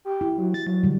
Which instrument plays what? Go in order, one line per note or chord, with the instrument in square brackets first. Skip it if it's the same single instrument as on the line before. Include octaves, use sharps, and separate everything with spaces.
[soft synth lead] G4
[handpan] E4
[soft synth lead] F#3
A6
F#3
[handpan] D3 G3